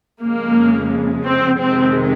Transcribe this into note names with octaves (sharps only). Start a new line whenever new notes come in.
F2 C#3 G#3 A#3
C4
F2 C3 D#3 G#3 C4